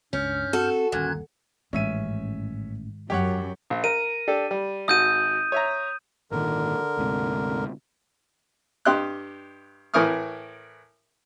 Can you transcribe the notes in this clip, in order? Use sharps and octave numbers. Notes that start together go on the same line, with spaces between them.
C#2 G2 C#4 F6 G6
C4 F#4 A4
G1 D#2 A#2 C#4 F#6 G#6
A1 G#2 D#3 C#4 E5 D#7
F#2 G4 C#5 F#5
A#1
A#4 D#7
D4 G4 A4
G3
G#1 F#4 D#6 G6 D#7
C#5 E5 A#5
G#1 A#2 D3 D#3 A#4
D2 G#2 C3
G2 G4 D#5 C6 F#6
A2 E3 A#4 C#6 D#6 F6